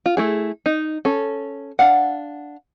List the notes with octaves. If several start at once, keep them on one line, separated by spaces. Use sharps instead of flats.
F4
A3 E4 G#4
D#4
C#4 A4
D4 F5 F#5